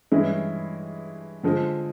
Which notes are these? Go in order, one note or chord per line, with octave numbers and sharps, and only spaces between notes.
G2 E3 G#3 C#4 E4
D3 F3 G#3